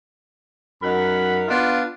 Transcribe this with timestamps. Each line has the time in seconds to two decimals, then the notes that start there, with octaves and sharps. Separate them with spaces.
0.83 F#2 D#4 A#4 F#5 B5
1.49 B3 D4 F4